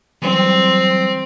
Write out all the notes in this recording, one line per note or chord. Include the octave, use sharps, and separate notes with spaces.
E3 F#3 G3 C4